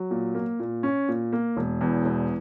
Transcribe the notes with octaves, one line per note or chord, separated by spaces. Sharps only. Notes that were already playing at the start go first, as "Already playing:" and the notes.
Already playing: F#3
A#2
A#3
A#2
C#4
A#2
A#3
E1
E2
E1